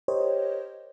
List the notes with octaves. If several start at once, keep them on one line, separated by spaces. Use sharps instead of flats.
G4 A#4 C5 C#5 D#5